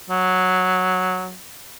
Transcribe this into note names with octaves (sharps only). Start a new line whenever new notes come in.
F#3